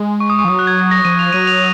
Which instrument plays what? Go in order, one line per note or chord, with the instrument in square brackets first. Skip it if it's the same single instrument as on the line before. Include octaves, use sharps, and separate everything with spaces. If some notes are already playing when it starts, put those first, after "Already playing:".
Already playing: [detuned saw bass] G#3
[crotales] C#6
D#6
C#6
[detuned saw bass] F3
[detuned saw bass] F#3 [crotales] D#6
[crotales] F#6
G#6
G#6
A#6
[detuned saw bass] F3 [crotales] D#7
[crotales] F7
[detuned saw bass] F#3 [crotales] D#7
[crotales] F7